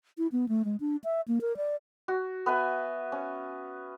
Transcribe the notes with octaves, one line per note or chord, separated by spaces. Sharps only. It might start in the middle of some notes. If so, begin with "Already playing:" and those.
E4
B3
A3
G#3
D4
E5
A#3
A#4
D5
F#4
B3 B4 E5 G#5
C#4